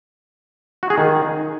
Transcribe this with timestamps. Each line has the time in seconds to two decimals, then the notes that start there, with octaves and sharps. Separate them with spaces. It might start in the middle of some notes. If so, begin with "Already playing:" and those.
0.83 F#4
0.90 G#4
0.98 D#3